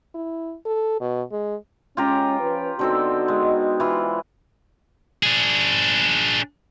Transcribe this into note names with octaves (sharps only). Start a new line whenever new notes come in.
E4
A4
B2
G#3
G#3 C#4 F4 G4 A#5
F3 C#4 B4
D3 B3 C4 D#4 F#4 A4
G#3
E3 F4
D4 G#4